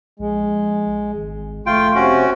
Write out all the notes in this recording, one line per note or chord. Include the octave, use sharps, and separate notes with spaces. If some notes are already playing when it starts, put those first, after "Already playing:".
A#1 G#3
G#1
F1 A3 F4 G5
C3 C#4 F#4